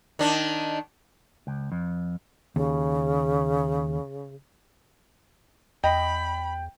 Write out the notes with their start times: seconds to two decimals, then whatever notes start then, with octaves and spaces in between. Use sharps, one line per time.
0.19 D#3 D4
1.47 C#2
1.72 F2
2.56 D#2 C#3
5.84 E2 D#5 G5 B5